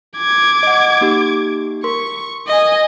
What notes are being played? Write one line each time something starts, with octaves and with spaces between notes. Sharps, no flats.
D6 G#6
D#5 F#5
A#3 D#4 G4
A#4 C6 C#6
D#5 G#5